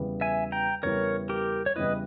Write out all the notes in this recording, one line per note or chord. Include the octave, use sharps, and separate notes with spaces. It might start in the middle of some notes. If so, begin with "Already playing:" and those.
Already playing: E2 C#3 G3 B3 E4
E5 G#5
G5 A#5
E2 C#3 G3 B3 E4 A#4 C#5
G4 A#4
C#5
E2 C#3 G3 B3 E4 B4 D#5